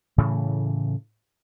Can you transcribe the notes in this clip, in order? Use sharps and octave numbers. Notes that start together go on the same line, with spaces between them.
A2 C#3 E3 A3